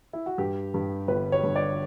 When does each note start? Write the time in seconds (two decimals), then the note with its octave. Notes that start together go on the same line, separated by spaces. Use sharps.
0.13 E4
0.26 F#4
0.38 G2 G4
0.74 G2
1.08 G1 B4
1.32 C#5
1.43 G2
1.56 D5